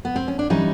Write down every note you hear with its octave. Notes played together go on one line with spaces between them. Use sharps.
B3
C4
C#4
D4
E3 G3 C#4 D#4